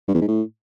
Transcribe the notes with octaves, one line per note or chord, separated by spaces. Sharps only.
G2
E2
G#2
A2